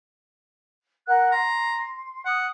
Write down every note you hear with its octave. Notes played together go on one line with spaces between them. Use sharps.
A#4 F#5 F#6
A#5 C6
F#5 D#6